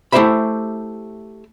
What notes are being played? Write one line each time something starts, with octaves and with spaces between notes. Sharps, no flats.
A3 E4 G4 C5 E5 B5